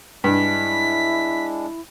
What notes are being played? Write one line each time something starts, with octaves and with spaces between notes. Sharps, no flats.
G2 G#3 D4 E4 B6